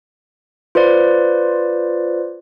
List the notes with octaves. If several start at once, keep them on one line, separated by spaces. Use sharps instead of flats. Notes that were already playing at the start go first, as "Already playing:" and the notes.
F4 B4 C5 D5